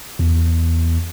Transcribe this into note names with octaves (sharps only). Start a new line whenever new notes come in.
E2